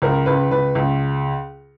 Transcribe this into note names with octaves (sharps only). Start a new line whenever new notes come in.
C#2 A#4
C#2 B4
C#2 B4
C#2